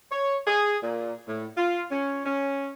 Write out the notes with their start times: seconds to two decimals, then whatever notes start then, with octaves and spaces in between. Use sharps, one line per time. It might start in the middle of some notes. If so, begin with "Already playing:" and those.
0.11 C#5
0.47 G#4
0.83 A#2
1.27 A2
1.57 F4
1.91 C#4
2.25 C#4